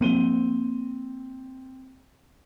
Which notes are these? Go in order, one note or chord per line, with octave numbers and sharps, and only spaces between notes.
F3 A#3 C4 D#7 G7